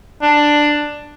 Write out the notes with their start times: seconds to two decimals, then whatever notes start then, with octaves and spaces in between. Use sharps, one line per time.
0.22 D4